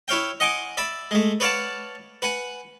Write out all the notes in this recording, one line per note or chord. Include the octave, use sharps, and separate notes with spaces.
E4 C#5 F5 G5
D#5 F#5 G#5 C6 D6
D5 E5 B5
G#3 A3
B4 C#5 D5 F5 F#5 A5
B4 F#5 G#5